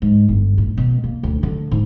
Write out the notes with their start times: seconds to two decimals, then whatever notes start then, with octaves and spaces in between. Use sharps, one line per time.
0.02 G#2
0.28 G1
0.58 A2
0.77 B2
1.04 A#3
1.23 D2
1.43 D3
1.71 G#2